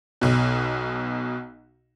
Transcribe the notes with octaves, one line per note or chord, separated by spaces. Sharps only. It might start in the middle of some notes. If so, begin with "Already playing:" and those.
B1 B2